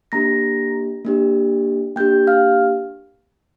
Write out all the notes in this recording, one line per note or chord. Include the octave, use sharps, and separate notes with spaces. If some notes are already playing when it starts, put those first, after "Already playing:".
A#3 D4 G4 A#5 A#6
A#3 D4 G4
A#3 D4 G4 G5 G6
F5 F6